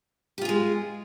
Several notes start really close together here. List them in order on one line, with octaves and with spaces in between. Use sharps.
G4 F4 G#4 G#3